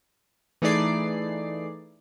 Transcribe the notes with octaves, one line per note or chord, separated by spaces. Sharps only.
E3 A3 D#4 G#4 D5 C7